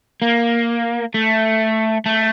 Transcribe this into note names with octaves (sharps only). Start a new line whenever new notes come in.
A#3
A3
A3